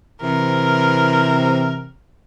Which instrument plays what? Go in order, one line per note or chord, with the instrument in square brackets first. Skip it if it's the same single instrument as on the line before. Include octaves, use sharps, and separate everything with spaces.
[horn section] C3 E3 [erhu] A#4